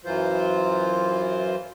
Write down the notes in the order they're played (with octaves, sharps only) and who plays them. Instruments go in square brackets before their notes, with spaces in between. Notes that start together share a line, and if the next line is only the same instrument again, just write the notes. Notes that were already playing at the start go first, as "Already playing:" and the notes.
[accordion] F#2 E3 F#3 F4 C5